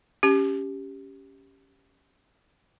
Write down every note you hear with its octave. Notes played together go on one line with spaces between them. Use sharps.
C#4 G4